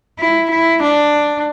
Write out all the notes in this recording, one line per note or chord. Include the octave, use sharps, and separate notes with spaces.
E4
E4
D4